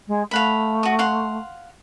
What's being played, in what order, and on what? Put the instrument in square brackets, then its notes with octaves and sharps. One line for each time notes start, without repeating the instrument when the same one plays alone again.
[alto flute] G#3
[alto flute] A3 [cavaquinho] F5 F#5 B5
[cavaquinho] F#4 D#6
F5 F#5 C6